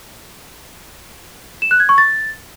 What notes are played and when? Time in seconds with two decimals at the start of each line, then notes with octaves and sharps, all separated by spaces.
1.62 E7
1.71 F#6
1.80 G#6
1.89 C#6
1.98 A6